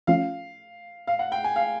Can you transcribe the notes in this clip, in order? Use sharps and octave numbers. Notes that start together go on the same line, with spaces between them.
F3 A3 C#4 F4 F5
F5
F#5
G5
G#5
F5